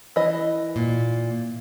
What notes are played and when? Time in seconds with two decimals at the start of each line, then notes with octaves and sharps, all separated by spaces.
0.16 E3 D#5
0.76 A#2